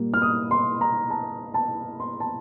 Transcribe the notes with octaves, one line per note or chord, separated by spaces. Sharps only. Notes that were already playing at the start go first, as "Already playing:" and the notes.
Already playing: A#2 G3 A#3
F6
D#6
C6
A#5
A5
A5
C6
A5